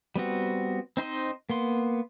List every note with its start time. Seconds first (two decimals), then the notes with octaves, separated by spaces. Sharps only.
0.16 G3 B3 C4 F#4
0.97 C4 D#4 C5 D#5
1.50 A#3 B3 C6